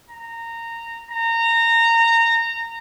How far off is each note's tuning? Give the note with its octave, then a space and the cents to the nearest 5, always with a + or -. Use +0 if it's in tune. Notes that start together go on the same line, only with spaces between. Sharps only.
A#5 -15
A#5 -20